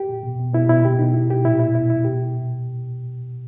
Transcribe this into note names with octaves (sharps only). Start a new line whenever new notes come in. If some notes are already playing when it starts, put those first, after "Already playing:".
Already playing: G4
A#2
B2
B2
B2 E4
B2 E4
B2 G4
B2 D#4
B2 E4
B2 G4
A#2 E4
A#2 E4
B2 E4
B2 E4
B2 G4